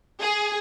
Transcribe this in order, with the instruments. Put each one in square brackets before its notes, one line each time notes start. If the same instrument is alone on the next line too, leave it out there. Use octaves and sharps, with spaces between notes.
[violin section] G#4